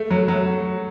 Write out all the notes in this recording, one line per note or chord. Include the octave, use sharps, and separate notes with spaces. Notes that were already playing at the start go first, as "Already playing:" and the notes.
Already playing: A3
F#3
F#3